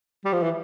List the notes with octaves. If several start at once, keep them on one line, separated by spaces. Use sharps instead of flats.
G3
F3
E3